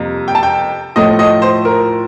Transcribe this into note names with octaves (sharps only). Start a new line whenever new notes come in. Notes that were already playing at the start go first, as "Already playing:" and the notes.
Already playing: F2 C3 G3 A#3
G5
A5
G5
A2 F3 A3 D#5
D#5
C5
A#4